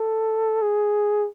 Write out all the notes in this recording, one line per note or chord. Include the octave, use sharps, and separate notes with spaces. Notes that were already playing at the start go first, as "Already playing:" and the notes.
Already playing: A4
G#4